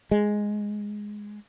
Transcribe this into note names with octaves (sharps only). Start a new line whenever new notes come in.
G#3